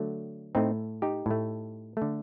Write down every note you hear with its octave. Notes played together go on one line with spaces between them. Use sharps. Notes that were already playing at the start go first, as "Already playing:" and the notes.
Already playing: D3 F#3 A3
A2 A3 C4 D#4
D#4 G4
A2 A3
D3 A3